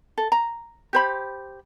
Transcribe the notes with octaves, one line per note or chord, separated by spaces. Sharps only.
A4
A#5
G4 C5 B5